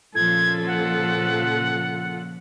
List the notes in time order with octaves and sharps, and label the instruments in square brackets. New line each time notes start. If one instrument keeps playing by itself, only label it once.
[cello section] A#2 C#3 F3 [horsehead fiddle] F4 A4 [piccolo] G#6
[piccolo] F#5